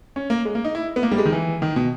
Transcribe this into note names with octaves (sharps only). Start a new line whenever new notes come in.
C#4
A#3
G#3
A#3
D#4
E4
B3
A#3
G3
G#3
D#3
E3
D#3
B2